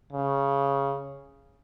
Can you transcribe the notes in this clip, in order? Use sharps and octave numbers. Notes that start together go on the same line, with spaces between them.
C#3